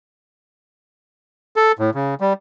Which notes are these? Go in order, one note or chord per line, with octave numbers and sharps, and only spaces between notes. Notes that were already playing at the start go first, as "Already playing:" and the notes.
A4
A2
C#3
G3